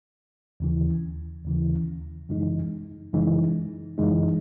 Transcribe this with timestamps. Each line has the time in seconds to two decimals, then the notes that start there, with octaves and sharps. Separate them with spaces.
0.60 D#2 C#3 E3
1.45 D#2 C#3 E3
2.29 F#2 C#3 E3 G#3 D#4
3.13 F#2 C#3 E3 G#3 D#4
3.98 F#2 C#3 E3 G#3 D#4